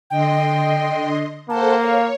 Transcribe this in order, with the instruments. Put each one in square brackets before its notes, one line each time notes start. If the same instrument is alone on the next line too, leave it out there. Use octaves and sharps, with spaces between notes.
[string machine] D3 D#5 C6 [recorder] G5
[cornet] A#3 [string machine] A4 C5 F#5 [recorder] A5
[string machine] C#5 [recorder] F5